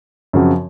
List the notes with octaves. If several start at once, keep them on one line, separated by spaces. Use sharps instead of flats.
F#2 C#3 F3 C4 F#4